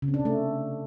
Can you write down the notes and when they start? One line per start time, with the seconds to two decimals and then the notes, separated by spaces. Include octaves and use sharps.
0.02 C#3
0.08 C4
0.14 D4
0.20 C3
0.25 A3